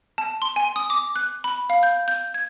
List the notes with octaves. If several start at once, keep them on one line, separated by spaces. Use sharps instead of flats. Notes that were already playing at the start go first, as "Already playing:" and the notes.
A5
C6
G#5
D#6
D6
F#6
B5
F5
G6
G6
G#6